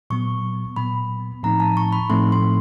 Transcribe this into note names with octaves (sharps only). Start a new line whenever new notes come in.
A#2 F#3 B3 C#6
A#2 F#3 B3 B5
A2 F3 A3 C4 D#4 A#5
A5
C#6
B5
A2 F3 A3 C4 D#4 C6
C6